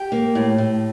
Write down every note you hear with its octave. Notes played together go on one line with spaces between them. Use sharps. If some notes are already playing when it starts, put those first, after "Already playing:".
Already playing: G4 G5
A#3
A2
A2